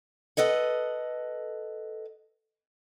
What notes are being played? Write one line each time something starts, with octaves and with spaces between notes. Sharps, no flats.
A4 B4 D#5 F#5